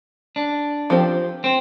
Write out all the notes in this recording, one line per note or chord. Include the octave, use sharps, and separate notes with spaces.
D4
F3 C4 G4 C5
C4